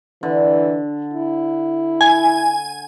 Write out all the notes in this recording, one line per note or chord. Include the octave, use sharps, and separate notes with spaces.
D3 E3
E4
G#5